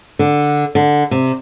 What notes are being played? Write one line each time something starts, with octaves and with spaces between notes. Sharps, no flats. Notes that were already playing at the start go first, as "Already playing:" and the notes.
D3
D3
C3